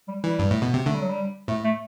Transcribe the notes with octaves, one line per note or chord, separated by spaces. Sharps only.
G3
E3 G3
G2
A2
B2
C3
D3 A3
G3
F#3
G3
A2 A3
A3